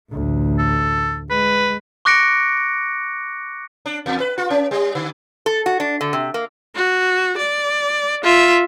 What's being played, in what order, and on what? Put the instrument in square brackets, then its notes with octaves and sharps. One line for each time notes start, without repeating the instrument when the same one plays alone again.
[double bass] A1 D2
[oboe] A4
[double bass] G#3 [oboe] B4
[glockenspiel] C#6 D6 F#6 A#6 C#7 D7
[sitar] D4
E2
B4
F4
C#4
G3
D3
[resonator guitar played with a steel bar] A4
F#4
D4
D3
C3
A#3
[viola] F#4
D5
F4 E5